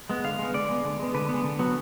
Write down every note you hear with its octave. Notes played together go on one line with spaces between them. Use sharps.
G#3 B3
D3 F5
G#3 B3
D3 D5
G#3 B3
D3
G#3 B3
D3 B4
G#3 B3
D3
F#3 B3